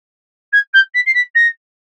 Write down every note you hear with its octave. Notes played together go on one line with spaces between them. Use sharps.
G#6
G6
B6
C7
B6
A#6